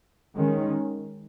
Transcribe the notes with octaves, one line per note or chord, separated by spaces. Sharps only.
D#3 G#3 C#4